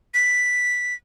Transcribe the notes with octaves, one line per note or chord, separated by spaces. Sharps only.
B6